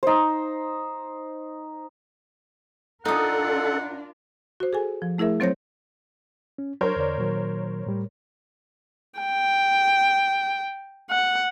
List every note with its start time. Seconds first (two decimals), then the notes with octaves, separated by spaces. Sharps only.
0.03 D#4 C5
3.05 D4 D#4 F4 A4 A#4 F#5 D#6
4.60 F#4 C5
4.73 G#4 A4 G#5
5.02 F3
5.18 A3 E4 G#4 A#4 E5
5.40 F#3 C4 C5 C#5 G6 A#6
6.58 C#4
6.81 F#3 D4 A#4 C5 C#5
6.96 E2 D3 D5
7.18 A#2 D#3 F#3
7.86 A2 G3
9.19 G5
11.10 F#5